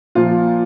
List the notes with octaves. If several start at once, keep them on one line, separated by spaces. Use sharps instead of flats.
A#2 F3 F4